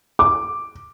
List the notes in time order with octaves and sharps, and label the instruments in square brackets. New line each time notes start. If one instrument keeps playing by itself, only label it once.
[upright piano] D6